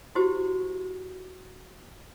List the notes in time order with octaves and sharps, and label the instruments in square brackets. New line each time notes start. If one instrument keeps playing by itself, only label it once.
[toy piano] E4 F#4 G4 C5